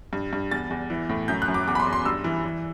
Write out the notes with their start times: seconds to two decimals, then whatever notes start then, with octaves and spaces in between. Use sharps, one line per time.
0.13 G2
0.33 G2
0.51 E2 A6
0.70 E2
0.90 E3
1.09 A2
1.28 F#2 G6
1.42 F#6
1.48 F#2
1.54 D6
1.67 E2 D6
1.75 B5
1.80 C6
1.87 E2
1.93 C6
2.05 G2 E6
2.24 E3
2.44 E3